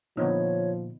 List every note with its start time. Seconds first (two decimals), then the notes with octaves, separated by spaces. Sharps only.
0.17 A#2 D3 F3 B3 D#4 C#5